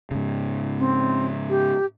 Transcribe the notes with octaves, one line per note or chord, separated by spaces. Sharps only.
G#2 C#3
C4
G4